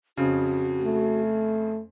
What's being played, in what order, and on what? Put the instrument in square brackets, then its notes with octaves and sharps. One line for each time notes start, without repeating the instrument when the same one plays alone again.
[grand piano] F2 C#3 [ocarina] F#4
[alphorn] A3